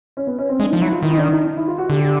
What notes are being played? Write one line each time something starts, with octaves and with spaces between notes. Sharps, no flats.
C#4
B3
C#4
C4
G#3 D4
F3 D#4
F#3 E4
F4
D#3 E4
D#4
D4
D#4
D#4
E4
F4
F#4
D3 G4
G4